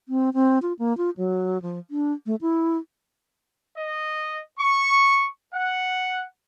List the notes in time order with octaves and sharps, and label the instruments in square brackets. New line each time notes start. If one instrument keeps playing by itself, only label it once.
[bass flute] C4
C4
F4
A#3
F4
F#3
F3
D4
A3
E4
[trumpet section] D#5
C#6
F#5